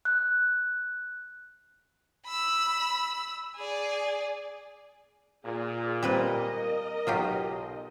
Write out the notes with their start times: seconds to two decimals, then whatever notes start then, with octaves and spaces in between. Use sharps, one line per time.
0.05 F#6
2.26 B5 E6
3.56 G#4 D5
5.44 A#2 G#4
6.03 G3 C4 A#4 B4 D#5
7.07 B1 F#3 F4 G4